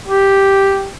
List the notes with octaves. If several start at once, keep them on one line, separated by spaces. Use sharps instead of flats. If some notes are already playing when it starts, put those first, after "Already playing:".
G4